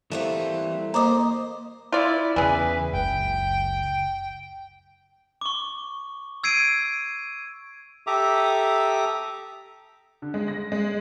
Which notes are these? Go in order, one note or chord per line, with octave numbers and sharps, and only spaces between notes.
E3 G3 A3 A#3 C4
A#3 C5 D5 D#5 A#5 D6 D#6
E4 F4 D5
E2 C#3 E3 G#4 B4
F#1 C#2 G5
C#6 D6
E6 G#6 C7 D7 D#7
G4 A4 E5 A#5 D6 D#6
D3
G#3
A#6
G#3